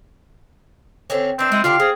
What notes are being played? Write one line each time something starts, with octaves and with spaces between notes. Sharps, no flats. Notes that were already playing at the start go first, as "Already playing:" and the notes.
D3 C4 C#4
E3 C4 D4
G#3 E4
D3 D4 F4 G4 F5
C4 G#4